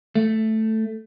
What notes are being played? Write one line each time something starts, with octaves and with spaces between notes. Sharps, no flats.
A3